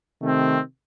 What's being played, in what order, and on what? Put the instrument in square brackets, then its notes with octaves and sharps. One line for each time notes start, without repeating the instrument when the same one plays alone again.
[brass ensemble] C3 D#3 A3 C4